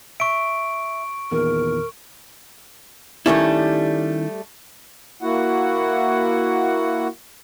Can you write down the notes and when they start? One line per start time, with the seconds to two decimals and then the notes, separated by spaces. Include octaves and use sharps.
0.20 E5 C#6 D7
1.32 E2 A#2 D#3 A#4
3.26 D#3 G3 A3 C#4 E4
5.22 A#3 E4 F#4 F#5